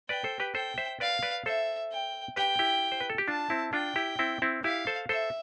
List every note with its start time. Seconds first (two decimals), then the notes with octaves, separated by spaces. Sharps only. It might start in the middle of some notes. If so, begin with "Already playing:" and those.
0.09 B4 D5 G5
0.24 A4 C5
0.40 G4 B4
0.55 A4 C5 G5
0.78 C5 E5
1.00 B4 D5 F5
1.23 B4 D5
1.46 A4 C5 E5
1.91 G5
2.36 G4 B4 G5
2.59 E4 G4
2.92 C5
3.00 B4
3.10 A4
3.18 G4
3.28 D4 F4 A5
3.50 C4 E4
3.73 D4 F4 G5
3.96 E4 G4
4.19 C4 E4
4.42 C4 E4
4.64 E4 G4 F5
4.87 A4 C5
5.09 A4 C5 E5